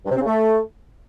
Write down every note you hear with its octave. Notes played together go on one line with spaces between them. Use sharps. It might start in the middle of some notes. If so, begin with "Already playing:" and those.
G2
C3
C4
C#3
A3